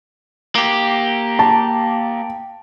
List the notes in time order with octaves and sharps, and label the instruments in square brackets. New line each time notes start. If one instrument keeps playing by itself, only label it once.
[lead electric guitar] A#3 G4
[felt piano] A5